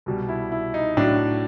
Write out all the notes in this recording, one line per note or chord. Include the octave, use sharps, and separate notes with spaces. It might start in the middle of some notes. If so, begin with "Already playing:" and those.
C2 B2 G3
E4
E4
D#4
A2 F#3 D4